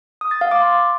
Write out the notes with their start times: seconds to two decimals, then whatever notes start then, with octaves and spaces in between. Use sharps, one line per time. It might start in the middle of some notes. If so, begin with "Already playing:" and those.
0.21 D#6
0.31 A6
0.41 F5
0.51 D6
0.62 C6